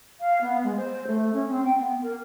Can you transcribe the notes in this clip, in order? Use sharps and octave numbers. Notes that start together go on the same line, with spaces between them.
F5
B3
G#3
C5
A3
C#4
C4
G5
B3
A#4